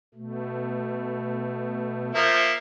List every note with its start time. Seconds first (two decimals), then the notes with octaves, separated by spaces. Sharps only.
0.14 B2 A3
2.15 F3 A#3 E5